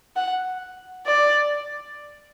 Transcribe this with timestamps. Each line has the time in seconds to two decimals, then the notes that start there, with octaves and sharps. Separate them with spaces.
0.16 F#5
1.07 D5